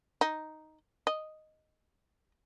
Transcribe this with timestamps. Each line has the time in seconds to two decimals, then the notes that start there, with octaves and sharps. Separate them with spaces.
0.21 D#4
1.07 D#5